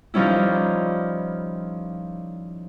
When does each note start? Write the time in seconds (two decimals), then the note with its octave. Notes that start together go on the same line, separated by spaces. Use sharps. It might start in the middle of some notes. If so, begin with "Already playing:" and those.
0.14 D#3 F3 G3 C#4 E4